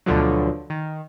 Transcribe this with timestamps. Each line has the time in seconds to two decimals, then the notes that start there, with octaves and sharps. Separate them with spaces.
0.06 D2 B2 D3 F3 F#3
0.70 D#3